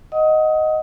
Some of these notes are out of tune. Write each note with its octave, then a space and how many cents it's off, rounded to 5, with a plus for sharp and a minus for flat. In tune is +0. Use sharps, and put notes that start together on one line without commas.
D#5 +0 F#5 +0 D#6 +25